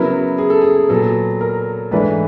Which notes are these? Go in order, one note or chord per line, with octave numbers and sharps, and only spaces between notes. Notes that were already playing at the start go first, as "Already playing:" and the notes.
Already playing: C#3 F#3 B3 E4 A#4
G#4
A4
G#4
A#2 F#3 B3 A4
A#4
G#2 E3 A3 D4 B4